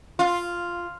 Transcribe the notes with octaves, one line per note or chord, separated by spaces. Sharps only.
F4